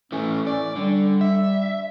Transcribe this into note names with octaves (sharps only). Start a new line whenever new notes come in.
E3 A3 C#4
C#4 D5
D3 G3
E5